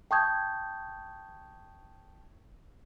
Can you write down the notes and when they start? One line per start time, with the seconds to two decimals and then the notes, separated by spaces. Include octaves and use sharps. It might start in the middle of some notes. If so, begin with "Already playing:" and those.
0.11 G5 A5 C#6 D#6 G6 G#6